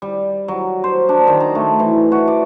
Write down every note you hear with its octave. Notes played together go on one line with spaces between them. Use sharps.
G3
F#3
C5
D4
D#3
A#5
A3
E3
F#4
D5